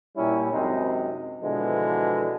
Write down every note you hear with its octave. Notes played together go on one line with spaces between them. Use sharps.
A#2 G3 C#4 E4
F#2 C3 G#3 C4 D#4
B2 D3 E3 F3 G#3